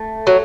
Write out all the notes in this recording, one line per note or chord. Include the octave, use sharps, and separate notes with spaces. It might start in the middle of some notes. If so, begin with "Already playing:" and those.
Already playing: A3
F#3